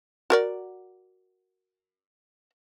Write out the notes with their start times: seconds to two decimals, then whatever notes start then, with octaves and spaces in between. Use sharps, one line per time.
0.30 F#4 A#4 D5